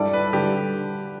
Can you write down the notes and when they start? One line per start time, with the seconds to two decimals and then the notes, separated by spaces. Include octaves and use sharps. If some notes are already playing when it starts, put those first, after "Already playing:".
Already playing: G2 G3 E4 A4 D5
0.13 B4
0.33 D3 G3 D4 G4